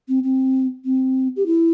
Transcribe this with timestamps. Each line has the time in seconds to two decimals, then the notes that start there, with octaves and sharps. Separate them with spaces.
0.08 C4
0.24 C4
0.85 C4
1.36 G4
1.46 E4